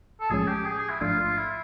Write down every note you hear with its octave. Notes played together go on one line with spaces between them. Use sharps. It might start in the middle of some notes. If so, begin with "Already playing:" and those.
A4
B1 A2 F3 G#3 C#4 G#4
G4
G#4
G#4
E4
A1 G#2 F3 A3 D4 F4
F4
E4